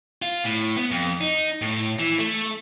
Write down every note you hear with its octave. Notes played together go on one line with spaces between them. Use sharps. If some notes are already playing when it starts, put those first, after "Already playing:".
F4
A2
B3
F2
D#4
A2
E3
A3